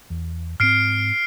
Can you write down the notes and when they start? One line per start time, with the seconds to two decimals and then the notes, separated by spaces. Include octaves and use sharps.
0.10 E2
0.60 G#2 C4 F6 C7 D7